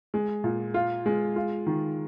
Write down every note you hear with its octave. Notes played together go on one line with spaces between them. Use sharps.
G#3
A#2
F4
G#3
F4
D#3